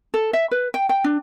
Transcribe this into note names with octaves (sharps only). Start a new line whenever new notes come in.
A4
E5
B4
G5
G5
D4